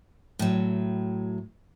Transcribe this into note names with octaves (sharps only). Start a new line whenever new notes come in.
A2 F#3